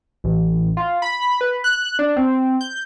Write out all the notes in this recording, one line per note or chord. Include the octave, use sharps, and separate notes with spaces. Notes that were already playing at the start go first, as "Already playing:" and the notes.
A1
F4
B5
B4
F#6
D4
C4
G6